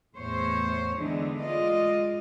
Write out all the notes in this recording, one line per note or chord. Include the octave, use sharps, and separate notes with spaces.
E2 A2 C5 C#5
D3 E3 G#3 B3 D4 D#4
G#3 F4 D5 D#5